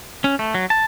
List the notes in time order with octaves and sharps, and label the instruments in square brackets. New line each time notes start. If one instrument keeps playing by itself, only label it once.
[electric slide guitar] C#4
A3
F#3
A5